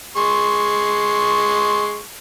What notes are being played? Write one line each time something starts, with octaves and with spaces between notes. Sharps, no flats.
G#3 C6 C#6